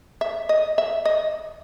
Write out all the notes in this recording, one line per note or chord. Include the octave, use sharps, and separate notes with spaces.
E5
D#5
E5
D#5